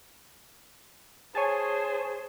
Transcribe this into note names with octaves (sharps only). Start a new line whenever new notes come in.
G#4 C5 C#5 G#5 A5